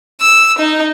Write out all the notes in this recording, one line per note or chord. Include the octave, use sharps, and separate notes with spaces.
E6
D#4